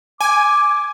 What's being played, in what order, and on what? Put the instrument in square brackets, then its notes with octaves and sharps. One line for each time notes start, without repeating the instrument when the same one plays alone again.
[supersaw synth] G#5 [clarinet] D6